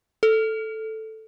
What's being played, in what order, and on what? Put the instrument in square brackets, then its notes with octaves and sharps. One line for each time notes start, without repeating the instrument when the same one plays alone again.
[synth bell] A4